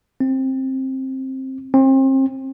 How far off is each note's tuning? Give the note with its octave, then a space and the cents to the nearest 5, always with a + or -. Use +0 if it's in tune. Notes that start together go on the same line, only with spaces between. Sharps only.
C4 +15
C4 +35